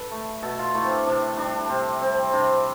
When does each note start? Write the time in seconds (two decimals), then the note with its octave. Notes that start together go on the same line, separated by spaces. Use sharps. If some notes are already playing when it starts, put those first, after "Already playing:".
Already playing: A4 B4
0.11 A3
0.42 B2 A4
0.59 F4
0.74 A3 E4
0.85 C4
0.90 D4
1.06 C3 D4
1.37 G3 D4
1.69 C3 C4
2.00 G3 C4
2.33 C3 D4